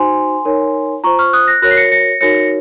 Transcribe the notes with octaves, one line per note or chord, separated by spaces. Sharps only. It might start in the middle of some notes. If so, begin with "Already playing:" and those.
Already playing: D#4 F#4 C5 G#5 C6
D#4 A#4 C#5
F4 C5 A#5 C#6
C#6 F6
D#6 F#6
F#6 A#6
F#4 A#4 C#5 F#6 A#6
C7
A#6 C#7
A#6 C#7
D#4 F#4 A#4 C#5 A#6 C#7